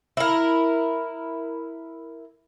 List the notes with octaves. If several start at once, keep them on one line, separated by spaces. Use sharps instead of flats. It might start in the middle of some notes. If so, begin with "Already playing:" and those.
E4 A#4